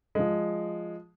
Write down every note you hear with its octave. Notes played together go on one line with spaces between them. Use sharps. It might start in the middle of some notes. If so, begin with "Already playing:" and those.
F3 G#3